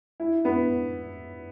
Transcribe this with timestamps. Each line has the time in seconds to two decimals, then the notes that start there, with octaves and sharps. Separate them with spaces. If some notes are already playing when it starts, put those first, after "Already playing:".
0.20 E4
0.45 B3